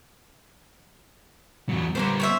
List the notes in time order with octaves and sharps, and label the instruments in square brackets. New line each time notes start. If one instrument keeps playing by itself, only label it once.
[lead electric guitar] E2 F#3
[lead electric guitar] G3 B3 [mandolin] A#3 C#4 C5
[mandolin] C#4 C5 E5